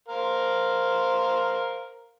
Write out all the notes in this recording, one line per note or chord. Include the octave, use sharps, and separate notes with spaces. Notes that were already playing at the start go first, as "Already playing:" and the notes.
A#4 C5 F5